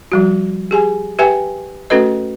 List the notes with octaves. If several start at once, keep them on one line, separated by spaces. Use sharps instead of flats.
F3 G3 F#4
G4 G#4 G#5
G4 B4 E5 G5 G#5
A3 C#4 F#4 A4 B4 D#5